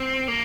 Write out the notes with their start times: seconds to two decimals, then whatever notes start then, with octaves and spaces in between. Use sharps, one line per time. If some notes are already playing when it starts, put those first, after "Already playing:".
Already playing: C4
0.28 A#3